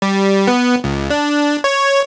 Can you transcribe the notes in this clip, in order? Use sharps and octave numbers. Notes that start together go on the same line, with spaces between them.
G3
B3
C#2
D4
C#5